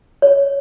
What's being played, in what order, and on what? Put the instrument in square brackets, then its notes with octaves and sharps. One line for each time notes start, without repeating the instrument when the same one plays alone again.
[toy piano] C#5